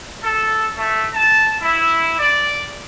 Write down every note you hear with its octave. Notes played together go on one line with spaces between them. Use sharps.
A4
A3
A5
E4
D5